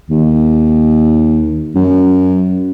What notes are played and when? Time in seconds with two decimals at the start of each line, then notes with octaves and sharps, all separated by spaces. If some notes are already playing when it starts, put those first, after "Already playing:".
0.10 D#2
1.75 F#2